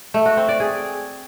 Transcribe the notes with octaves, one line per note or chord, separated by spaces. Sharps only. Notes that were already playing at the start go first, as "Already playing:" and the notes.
A3
F#4
C4
D5
G#4